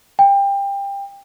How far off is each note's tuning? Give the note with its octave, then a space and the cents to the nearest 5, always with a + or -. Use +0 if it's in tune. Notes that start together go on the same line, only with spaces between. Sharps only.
G5 +25